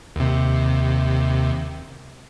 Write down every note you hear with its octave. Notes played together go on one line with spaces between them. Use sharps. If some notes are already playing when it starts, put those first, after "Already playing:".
D#2 C3